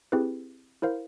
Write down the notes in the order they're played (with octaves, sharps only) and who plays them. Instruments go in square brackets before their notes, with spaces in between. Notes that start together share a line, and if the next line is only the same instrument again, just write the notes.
[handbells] C4 E4 G4 G#4 B4
E4 A#4 C5 F5